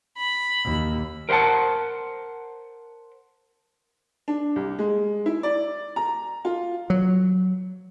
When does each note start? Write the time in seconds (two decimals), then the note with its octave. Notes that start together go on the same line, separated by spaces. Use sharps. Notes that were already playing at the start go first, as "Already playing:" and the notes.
0.17 B5
0.64 D#2
1.29 A#4 C5 D#5 F#5 A5
4.28 D4
4.56 C2
4.79 G#3
5.26 E4
5.43 D5
5.96 A#5
6.45 F4
6.90 F#3